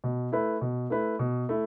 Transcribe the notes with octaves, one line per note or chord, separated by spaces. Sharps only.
B2
A3 E4 B4
B2
A3 E4 B4
B2
A3 E4